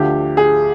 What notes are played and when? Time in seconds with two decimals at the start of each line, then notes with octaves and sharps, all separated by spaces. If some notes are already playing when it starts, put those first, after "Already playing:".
Already playing: D2 D3 F3 G4
0.37 G#4